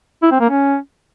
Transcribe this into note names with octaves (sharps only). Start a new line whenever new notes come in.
E4
C4
A#3
C#4